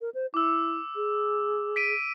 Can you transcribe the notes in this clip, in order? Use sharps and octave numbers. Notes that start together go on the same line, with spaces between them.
A#4
C5
E4 D6 E6
G#4
B6 D7 D#7